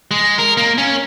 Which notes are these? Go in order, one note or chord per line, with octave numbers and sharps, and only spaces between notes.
G#3
A#4
A#3
C#4